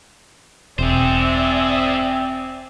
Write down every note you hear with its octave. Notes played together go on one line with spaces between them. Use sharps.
E1 C4 G#4 C5 D5 E5